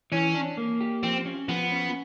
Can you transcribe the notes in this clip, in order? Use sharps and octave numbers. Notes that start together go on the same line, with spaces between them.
E3 C#4
D4
A#3
G4
F3 C4
C#4
F3 B3
C#4